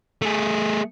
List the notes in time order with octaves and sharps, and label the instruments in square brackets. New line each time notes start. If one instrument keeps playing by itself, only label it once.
[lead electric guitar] A3 G#4